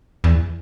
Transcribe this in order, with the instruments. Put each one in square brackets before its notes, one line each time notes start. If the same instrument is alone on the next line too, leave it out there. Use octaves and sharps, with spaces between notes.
[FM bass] E2